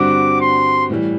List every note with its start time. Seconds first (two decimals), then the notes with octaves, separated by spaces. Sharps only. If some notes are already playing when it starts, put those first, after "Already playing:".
Already playing: G2 D3 G3 C4 F#4 D6
0.41 C6
0.90 A2 E3 G3